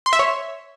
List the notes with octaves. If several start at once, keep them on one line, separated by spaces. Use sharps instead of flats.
C6
E5
C#5